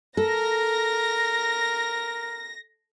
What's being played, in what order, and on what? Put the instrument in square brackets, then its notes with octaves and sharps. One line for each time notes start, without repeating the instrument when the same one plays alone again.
[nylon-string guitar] A4 [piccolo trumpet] A#4 [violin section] A#6